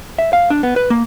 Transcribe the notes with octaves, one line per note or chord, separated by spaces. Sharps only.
E5
F5
D4
B3
B4
A#3